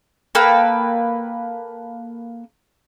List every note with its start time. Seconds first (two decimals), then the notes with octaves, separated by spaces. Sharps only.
0.35 A#3 A4 B4 G5